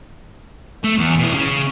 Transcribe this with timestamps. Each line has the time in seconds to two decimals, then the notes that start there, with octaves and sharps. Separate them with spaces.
0.84 A3
0.98 E2
1.19 B2 E4
1.34 C#3